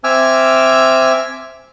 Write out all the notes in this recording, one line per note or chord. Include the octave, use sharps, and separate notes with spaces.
C4 E5 G#5 D6 E6 F6